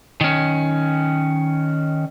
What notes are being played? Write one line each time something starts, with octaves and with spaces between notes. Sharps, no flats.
D#3 C#4